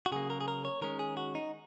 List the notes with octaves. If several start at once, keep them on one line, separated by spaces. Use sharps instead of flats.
F#4
C#3 F#3 A#3 G#4
A#4
G#4
A#4
C#5
D#3 G#3 C#4 A#4
G#4
F#4
D#4